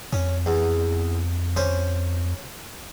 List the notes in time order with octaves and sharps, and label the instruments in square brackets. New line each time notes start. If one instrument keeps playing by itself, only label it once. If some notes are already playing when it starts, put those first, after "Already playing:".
[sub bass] F2 [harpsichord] C#4
[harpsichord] E2
C#4 C5